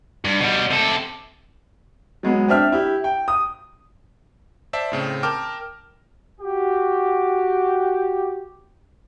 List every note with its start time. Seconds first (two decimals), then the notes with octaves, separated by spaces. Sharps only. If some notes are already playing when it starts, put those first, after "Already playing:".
0.25 G2
0.40 B2 G3
0.70 C3 A4
2.23 F#3 G#3 B3
2.48 C4 D4 E5 F6
2.72 E4 G4
3.04 G5
3.28 D#6
4.73 C5 D5 E5 A5
4.92 A2 C#3 C4
5.23 A#4 G5 A5 D6 F6
6.41 F#4 G4